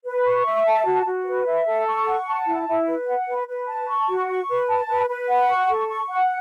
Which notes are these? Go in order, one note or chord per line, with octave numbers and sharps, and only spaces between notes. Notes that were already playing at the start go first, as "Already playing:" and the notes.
B4
C#6
E5
A5
F#4
F#4
B4
E5
A4
C#6
F#5
A5
E4
E4
B4
F#5
B4
B4
A5
C#6
F#4
C#6
B4
A5
B4
B4
F#5
C#6
A4
C#6
F#5